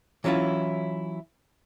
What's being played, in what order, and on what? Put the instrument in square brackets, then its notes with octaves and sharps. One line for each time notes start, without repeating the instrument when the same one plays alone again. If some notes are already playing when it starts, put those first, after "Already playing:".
[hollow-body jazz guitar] E3 F#3 C#4 E4 F4